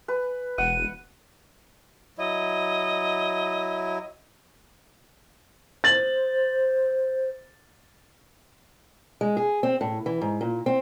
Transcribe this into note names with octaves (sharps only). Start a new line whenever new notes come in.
B4
E1 F#5 D#7
F#3 E4 D#5
C5 A6 F#7
G#3
G#4
C4
A2
E3
G#2
A#2
C4